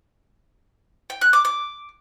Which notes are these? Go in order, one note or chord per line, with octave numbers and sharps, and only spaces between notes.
G5
F#6
D6
D6